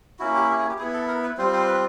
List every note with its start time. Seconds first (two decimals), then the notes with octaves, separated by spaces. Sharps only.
0.19 A#3 C#4 E4 F#4
0.34 G4
0.49 G4
0.59 G#4
0.69 G4
0.78 B3 E4 G#4
0.94 A4
1.08 A#4
1.23 B4
1.38 G3 C4 F4 C5
1.53 C5
1.68 B4